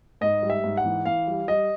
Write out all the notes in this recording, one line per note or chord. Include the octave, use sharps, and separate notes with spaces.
G#2 D#5
G3
E5
G#2
F#5
E3
E3 F5
G3
G3 D#5